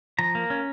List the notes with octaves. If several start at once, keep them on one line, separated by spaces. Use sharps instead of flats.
F3 A#5
A#3
C#4